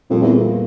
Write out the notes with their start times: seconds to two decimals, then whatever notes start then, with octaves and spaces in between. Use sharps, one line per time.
0.10 F2 A#2 G3 A#3
0.22 E2